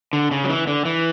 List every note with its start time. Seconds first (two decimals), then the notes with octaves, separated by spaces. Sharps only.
0.13 D3
0.31 C#3
0.44 F#3
0.49 E3
0.67 D3
0.85 E3